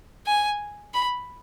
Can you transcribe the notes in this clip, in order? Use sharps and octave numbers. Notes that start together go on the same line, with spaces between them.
G#5
B5